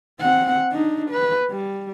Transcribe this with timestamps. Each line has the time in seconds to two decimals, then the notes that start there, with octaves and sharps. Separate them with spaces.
0.20 C4 F#5
0.72 D4 D#4
1.11 B4
1.51 G3